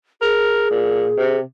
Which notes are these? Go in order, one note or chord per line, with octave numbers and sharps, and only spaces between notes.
G#4 A#4
A#2
C3